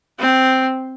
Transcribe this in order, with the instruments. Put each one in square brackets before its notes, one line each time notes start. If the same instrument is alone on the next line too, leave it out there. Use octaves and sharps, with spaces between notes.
[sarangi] C4